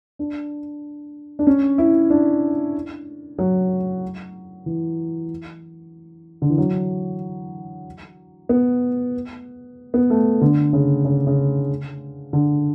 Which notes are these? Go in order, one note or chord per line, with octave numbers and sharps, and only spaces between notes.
D4
D4
C#4
E4
D4
F#3
E3
D3
E3
F#3
B3
B3
A3
D3
C#3
C#3
C#3
D3